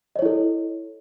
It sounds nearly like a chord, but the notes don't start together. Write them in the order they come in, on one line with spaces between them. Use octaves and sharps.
D#5 C#5 E4 A4